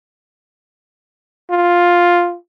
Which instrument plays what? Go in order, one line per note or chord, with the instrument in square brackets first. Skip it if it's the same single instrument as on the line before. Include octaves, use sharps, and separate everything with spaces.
[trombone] F4